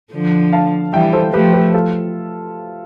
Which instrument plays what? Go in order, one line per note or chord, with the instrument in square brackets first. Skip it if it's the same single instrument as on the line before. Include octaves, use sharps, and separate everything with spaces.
[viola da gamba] D3 F3
[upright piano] F5 A5
[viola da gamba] E3 G3 [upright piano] E5 G5
[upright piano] A4 C5
[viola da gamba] F3 A3 [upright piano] G4 B4
[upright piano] G4 B4
F4 A4